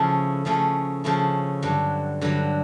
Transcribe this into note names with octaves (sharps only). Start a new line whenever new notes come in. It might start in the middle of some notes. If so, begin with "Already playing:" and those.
Already playing: C#3 F3 A3 C#4 E4
C#3 F3 A3 C#4 E4
C#3 F3 A3 C#4 E4
G2 D3 F#3
G2 D3 F#3